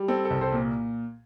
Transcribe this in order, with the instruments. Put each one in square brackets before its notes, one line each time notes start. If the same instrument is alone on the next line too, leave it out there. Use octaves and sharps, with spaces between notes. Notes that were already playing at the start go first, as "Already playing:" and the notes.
Already playing: [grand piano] G3
C4 A4
A4
C2
A4 C5
A#2